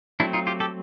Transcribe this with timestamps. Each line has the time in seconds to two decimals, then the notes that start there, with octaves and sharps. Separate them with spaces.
0.20 F#3 A3 C4 D4 E4
0.33 D#4 F4
0.47 F4 G4
0.60 G4 A4